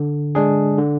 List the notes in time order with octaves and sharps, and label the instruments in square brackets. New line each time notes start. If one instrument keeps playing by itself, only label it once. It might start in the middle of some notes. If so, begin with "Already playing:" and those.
Already playing: [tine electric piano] D3
G#3 D4 G#4
D3